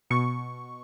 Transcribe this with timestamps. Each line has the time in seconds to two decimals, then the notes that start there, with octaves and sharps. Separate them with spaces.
0.10 B2 C#6